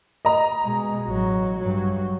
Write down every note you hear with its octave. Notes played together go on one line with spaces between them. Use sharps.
D#5 A#5
B2 G#3
A1 F#3
G2 F#3